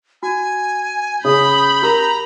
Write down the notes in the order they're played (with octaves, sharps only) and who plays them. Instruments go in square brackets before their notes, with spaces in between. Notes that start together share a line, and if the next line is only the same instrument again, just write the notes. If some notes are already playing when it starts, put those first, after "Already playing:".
[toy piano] F#4 [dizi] G#5
[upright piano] C#3 [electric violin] B5 G6 [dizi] D#6
[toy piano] G4 A#4 [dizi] A#5